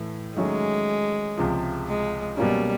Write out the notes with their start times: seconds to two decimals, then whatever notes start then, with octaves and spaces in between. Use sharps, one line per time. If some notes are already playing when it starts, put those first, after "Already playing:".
Already playing: A2 E3 A3
0.36 D#3 F#3 G#3 A3 C#4
1.37 C#2 C3 F3
1.88 G#3
2.37 B2 F#3 G3 A#3 C#4